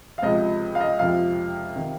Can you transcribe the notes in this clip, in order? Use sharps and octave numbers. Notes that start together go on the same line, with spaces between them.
F5
C#2 C3 F3 D#5
F5
D#5
F2 C3 F3 F5
C3 D#3